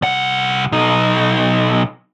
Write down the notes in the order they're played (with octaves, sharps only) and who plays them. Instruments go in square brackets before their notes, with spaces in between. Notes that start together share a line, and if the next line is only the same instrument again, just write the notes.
[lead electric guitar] C2 F#5
B1 D#4